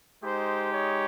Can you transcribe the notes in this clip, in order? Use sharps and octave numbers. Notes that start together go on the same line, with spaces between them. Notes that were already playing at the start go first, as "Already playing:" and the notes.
G#3 D#4 G4 C5
C#5